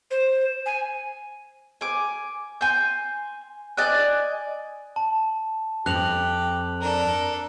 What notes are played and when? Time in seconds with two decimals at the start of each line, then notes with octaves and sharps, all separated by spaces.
0.11 C5
0.66 G#5
1.81 G#5 D6
2.61 G#5 C6 G6
3.77 D5 D#5 G#5 F#6
4.96 A5
5.86 F2 G4 F#6 F7 F#7
6.80 D4 A4 A#4